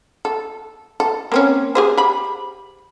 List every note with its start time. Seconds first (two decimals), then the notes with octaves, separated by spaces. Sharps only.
0.25 A4
1.00 A4
1.32 A#3 C4 C#4
1.75 G4 G#4 C5
1.97 G4 B5